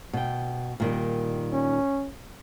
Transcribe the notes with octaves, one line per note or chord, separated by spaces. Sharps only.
B2 G5
A#2 D#3 G3
C#4